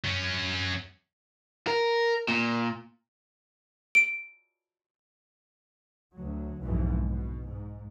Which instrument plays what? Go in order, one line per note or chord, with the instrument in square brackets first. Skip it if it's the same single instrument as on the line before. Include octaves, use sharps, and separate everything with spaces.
[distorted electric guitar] F#3 C#4
[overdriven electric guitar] A#4
A#2
[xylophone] D7
[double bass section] D2 F#3
B1 F2 G#2 B2 E3
B2
G#2